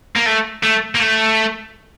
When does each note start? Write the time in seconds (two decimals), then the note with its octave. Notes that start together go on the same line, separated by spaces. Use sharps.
0.16 A#3
0.26 A3
0.63 A3
0.95 A#3
1.00 A3